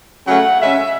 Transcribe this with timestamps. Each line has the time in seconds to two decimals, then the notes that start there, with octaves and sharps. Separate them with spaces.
0.26 C#3 F#3 A3 C#4 F#5
0.59 C#3 G#3 C#4 E5